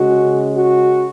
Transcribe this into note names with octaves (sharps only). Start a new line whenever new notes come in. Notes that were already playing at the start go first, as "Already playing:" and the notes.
Already playing: C#3 G#3 C#4 F#4
F#4